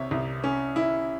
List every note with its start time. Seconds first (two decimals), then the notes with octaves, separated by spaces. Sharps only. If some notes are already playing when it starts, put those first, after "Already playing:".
Already playing: C2 C3 C#5 E5
0.11 C2
0.44 C#4
0.76 E4